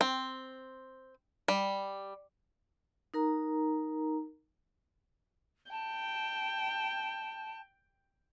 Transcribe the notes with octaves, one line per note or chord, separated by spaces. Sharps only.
C4
G3
D#4 A#4 A#5
G5 A5